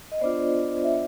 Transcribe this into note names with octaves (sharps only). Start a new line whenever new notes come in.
D#5
B3 D4 F4 C5 D5
E5